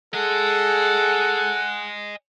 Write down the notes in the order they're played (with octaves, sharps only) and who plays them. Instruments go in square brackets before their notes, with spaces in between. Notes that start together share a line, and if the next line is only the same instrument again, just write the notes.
[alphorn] G#4 [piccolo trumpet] A4 [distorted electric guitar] D#5 G#5 [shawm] F#5